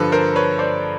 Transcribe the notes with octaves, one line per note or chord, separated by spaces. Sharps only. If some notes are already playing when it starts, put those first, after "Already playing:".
Already playing: G2 D3 F3 A4 B4
A#4 C5
B4 C#5
C5 D5